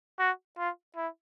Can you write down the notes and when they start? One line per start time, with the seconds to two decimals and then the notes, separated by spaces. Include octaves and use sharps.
0.19 F#4
0.58 F4
0.96 E4